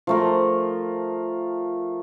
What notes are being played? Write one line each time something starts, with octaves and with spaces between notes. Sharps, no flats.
F3 A3 A#4